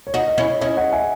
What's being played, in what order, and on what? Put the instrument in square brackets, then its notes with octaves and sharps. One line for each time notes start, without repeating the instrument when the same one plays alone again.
[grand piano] C#5
[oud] D#4 F#4 [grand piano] D#5
[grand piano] D#5
[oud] C#4 E4 [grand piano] C#5
[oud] C#4 E4 [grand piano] D#5
[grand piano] D#5 F#5
E5 G#5